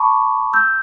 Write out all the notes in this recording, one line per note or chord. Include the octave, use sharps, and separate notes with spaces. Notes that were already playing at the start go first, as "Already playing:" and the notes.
Already playing: A5 B5 C#6 D6
E6 G6